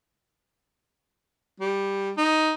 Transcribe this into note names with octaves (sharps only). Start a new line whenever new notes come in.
G3
D#4